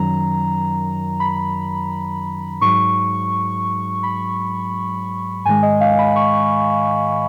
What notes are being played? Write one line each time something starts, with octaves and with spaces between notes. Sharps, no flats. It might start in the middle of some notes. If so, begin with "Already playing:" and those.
Already playing: F#2 D#3 F#3 A#5
B5
G#2 F#3 C#6
B5
G#2 D#3 G#3 G#5
D#5
F5
B5
C#6